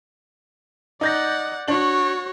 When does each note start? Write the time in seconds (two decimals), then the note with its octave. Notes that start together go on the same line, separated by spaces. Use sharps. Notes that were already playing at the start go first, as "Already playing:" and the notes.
1.01 D#4 D5 F#5 G6 A#6
1.68 D4 F#4 C#5 F#7